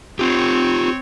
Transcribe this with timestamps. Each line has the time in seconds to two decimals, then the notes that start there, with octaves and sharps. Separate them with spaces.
0.19 C4 F4 G4 C#5